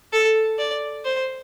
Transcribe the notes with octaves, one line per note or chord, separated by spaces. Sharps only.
A4
D5
C5